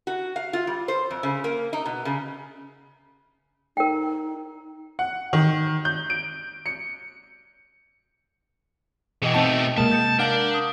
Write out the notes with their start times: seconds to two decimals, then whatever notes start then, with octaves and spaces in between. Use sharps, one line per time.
0.07 F#4
0.36 F5
0.53 F4
0.67 G3
0.88 C5
1.11 F2
1.23 C#3
1.44 A#3
1.73 D#4
1.86 B2
2.05 C#3
3.77 D#4 A#4 G5
4.99 F#5
5.33 D#3
5.85 G6
6.10 D7
6.66 C#7
9.22 B2 E3 G#4 D#5 G5
9.34 B2 A3 C4 D#4 A5
9.77 C3 G#3 A#3 A5
9.91 G6 A6 C#7
10.19 D4 A#4 F5 F#5 F6 G6
10.54 D#6